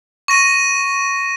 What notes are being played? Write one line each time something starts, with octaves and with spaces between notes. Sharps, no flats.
C#6 A#6 D#7